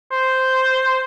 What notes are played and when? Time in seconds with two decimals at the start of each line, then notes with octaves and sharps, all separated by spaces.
0.12 C5